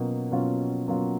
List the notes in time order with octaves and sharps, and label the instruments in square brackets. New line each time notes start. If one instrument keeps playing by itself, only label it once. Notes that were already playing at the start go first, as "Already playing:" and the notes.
Already playing: [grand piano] B2 F#3 A#3 C#4 F4
B2 F#3 A#3 C#4 F4
B2 F#3 A#3 C#4 F4